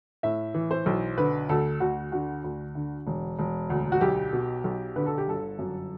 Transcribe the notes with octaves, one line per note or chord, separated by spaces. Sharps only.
A2 E5
E3
C5
B1
D3 B4
D2 A4
D2 F#4
D3 F#4
D2
D3
E1
E1
D2
F#4
B1 G4
B2
B1
D3 B4
A4
G4
G1 A4
F#2